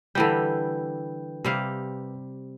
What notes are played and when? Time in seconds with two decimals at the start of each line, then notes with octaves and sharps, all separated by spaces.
0.15 D3 E3 G3 B4 G5 G6
1.45 C3 G3 F5